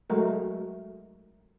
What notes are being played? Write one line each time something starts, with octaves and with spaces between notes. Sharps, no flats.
F#3 G#3 A3 A#4